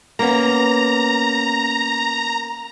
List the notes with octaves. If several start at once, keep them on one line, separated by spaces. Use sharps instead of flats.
A#3 B3 C#4 A#5